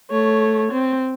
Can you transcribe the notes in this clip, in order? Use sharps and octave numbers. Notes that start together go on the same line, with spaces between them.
A3 C#5
C4